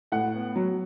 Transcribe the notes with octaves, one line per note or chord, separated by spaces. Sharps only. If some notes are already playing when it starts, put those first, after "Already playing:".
A2 F#5
B3
F#3